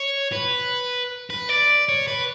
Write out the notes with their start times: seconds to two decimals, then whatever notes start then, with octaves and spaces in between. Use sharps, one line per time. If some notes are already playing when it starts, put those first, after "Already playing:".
Already playing: C#5
0.32 B4
1.30 B4
1.49 D5
1.89 C#5
2.07 B4